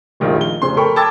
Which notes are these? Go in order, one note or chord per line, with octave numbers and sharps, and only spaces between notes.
F1 A#1 D#3 F4
G7
F1 C#3 C5 C6
A4 A#4 G5 B5 C#6
G5 A5 D6 E6 G#6 A6